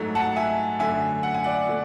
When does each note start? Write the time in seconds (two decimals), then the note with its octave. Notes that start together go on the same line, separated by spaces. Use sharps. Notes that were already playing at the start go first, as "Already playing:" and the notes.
Already playing: G#2 F#3 A3
0.15 F#5 A5
0.36 E5 G#5
0.79 F#2 D3 A3 E5 G#5
1.23 F#5
1.34 G#5
1.44 D5 F#5
1.68 B2 A3